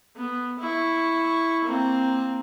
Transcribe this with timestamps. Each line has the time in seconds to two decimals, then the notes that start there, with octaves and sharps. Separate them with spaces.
0.16 B3
0.60 E4 C#6
1.64 A#3 C4